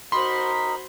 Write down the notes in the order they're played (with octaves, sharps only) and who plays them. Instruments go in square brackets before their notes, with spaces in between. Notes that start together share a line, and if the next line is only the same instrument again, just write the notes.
[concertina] D#4 A#4 [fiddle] F#4 C5 [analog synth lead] B5 [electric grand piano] C6